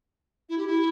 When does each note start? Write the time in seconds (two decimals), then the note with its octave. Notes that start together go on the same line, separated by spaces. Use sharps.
0.49 E4
0.58 G4
0.67 E4